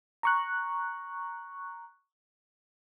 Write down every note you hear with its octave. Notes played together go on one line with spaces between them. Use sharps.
A#5 C#6 F#6